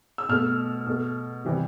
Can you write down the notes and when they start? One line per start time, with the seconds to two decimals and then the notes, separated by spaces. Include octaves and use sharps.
0.18 E6
0.29 B2 A3 F6
0.86 B2 A3
1.45 C3 E3 G3